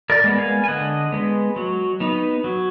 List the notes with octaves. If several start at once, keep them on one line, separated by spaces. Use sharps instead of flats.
A#4 D5
G#3 B3
F5 G#5
G#5
D3 D#5 F#5
G#3 B3
F#3
B3 D#4
F#3